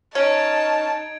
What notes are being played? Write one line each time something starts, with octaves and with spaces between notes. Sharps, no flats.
C#4 D#4 A5 G#6 D7